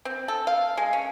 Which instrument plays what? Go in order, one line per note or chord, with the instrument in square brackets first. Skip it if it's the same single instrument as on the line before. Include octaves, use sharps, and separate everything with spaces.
[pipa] C4
A4
F5
G#3
C#4